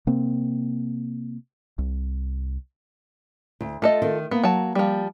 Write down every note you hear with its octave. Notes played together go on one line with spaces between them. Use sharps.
C3 A#3 C4
C2
D2
A3 F4 A4 D#5
D#3
A#3 B3
F#3 A5
F3 G3